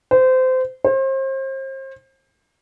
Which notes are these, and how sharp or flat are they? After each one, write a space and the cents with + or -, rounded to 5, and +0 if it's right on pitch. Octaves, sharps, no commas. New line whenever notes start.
C5 -25
C5 +35